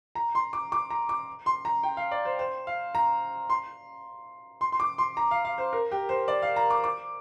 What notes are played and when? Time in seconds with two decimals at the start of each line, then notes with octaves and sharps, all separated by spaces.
0.15 A#5
0.35 C6
0.53 D6
0.72 D6
0.90 A#5
1.09 D6
1.46 C6
1.65 A#5
1.83 G5
1.97 F5
2.11 D5
2.25 C5
2.39 C5
2.67 F5
2.95 A#5
3.50 C6
4.61 C6
4.72 C6
4.80 D6
4.98 C6
5.17 A#5
5.31 F5
5.45 F5
5.58 C5
5.73 A#4
5.91 G4
6.09 C5
6.28 D5
6.42 F5
6.56 A#5
6.70 D6
6.84 D6